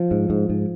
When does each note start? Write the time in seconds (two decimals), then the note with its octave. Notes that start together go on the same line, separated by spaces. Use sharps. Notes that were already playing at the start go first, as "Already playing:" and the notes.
Already playing: F3
0.11 G#2
0.30 G#2
0.50 G#2